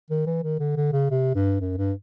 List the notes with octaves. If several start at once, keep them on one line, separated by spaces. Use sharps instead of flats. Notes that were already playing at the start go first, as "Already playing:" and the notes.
D#3
E3
D#3
D3
D3
C#3
C3
G2
F#2
G2